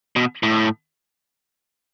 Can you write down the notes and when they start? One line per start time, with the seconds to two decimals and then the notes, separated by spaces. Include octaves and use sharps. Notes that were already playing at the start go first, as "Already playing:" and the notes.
0.16 B2
0.43 A2